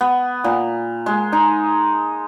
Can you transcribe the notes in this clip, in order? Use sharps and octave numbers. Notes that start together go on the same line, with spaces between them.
B3
A#2
G#3
D#4